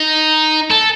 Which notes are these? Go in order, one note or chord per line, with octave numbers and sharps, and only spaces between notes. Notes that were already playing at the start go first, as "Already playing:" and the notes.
Already playing: D#4
A4